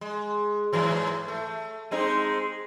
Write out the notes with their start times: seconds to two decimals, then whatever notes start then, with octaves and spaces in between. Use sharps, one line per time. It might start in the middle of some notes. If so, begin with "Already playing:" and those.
0.01 G#3
0.73 G#2 E3 F#3
1.28 A3
1.91 G#3 C4 D#4